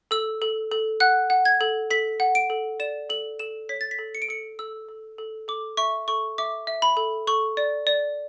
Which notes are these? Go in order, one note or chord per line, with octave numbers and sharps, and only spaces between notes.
A4 E6
A4
A4
F#5 F#6
F#5
G#6
A4
A4 B6
F#5
D7
A4
D5 E7
A4 F#7
A4 E7
C#5 B6
A6
B6
A4
C#7
D7
A4 C#7
A4 E6
A4
A4
A4 D6
E5 C#6
A4 C#6
E5 D6
E5
B5
A4
A4 C#6
D5
D5